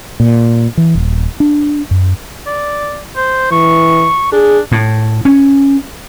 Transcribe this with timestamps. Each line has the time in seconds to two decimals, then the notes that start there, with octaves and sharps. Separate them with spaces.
0.20 A#2
0.77 E3
0.95 D#1
1.40 D4
1.91 F#2
2.47 D5
3.17 C5
3.51 E3 C#6
4.32 D4 G#4
4.72 A2
5.25 C#4